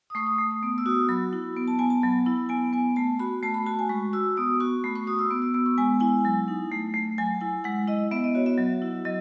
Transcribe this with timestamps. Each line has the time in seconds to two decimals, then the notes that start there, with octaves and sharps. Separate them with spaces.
0.10 D#6
0.15 A3 C#6
0.27 D#6
0.38 A3
0.51 D#6
0.63 B3
0.78 E6
0.86 F#4 D#6
1.09 F#3 B5
1.33 E4
1.56 B3
1.68 A5
1.79 B3 G#5
1.90 A5
2.02 F#3 B5
2.26 E4 B5
2.49 B3 G#5
2.73 B3 G#5
2.96 A3 A5
3.19 F#4 B5
3.43 A3 A5
3.54 B5
3.66 F#4 A5
3.79 G#5
3.89 G#3 C#6
4.13 F#4 E6
4.37 B3 D#6
4.60 F#4 C#6
4.84 A3 B5
4.96 C#6
5.07 F#4 D#6
5.19 E6
5.30 B3
5.42 E6
5.54 B3 E6
5.66 C#6
5.78 G#3 G#5
6.00 E4 G#5
6.25 F#3
6.48 D#4
6.72 A3
6.94 A3
7.18 F#3 G#5
7.41 E4 G#5
7.64 G#3 F#5
7.88 E4 D#5
8.11 B3 E5
8.24 D#5
8.35 F#4 C#5
8.46 E5
8.58 F#3
8.82 E4
9.05 F#3 D#5